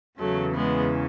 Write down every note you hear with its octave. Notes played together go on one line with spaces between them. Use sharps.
E2 C#3 E3 F#3 A3
G#3 B3